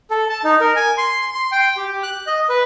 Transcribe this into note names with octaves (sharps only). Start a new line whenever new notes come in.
A4
A5
D#4
A#4
G#5
C6
C6
G5
G4
F#6
D#5
B4